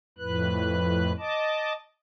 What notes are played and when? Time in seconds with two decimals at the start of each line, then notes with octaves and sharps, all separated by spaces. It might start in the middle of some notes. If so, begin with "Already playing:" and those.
0.18 F2 A2 B4 F#6
1.18 D#5 A5 D6